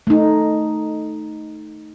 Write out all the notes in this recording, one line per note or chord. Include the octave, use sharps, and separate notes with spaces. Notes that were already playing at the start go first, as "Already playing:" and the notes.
A3 D#4